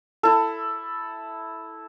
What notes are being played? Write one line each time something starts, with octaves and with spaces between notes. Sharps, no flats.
E4 A4